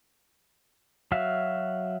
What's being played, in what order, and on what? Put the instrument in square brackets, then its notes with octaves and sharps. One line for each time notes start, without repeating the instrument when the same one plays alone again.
[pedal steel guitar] F#3 F#4 E5 F5